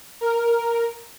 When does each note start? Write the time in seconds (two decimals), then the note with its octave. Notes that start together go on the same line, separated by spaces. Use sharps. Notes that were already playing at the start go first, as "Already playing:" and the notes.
0.21 A#4